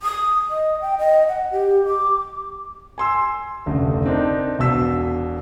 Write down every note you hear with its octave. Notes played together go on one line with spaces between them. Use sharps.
D#6
D#5
G5
D#5
F#5
G4
D6
G#5 C6 E6
F1 D2 C#3
C4 D4 D#4 A#4
E1 B2 E6 B6